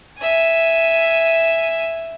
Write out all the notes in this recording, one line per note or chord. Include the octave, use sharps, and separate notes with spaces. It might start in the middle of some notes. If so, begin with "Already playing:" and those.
E5 G#5